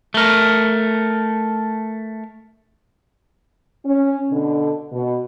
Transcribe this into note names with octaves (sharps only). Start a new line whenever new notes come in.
A3 A#4
C#4
B2 D3 D4
B2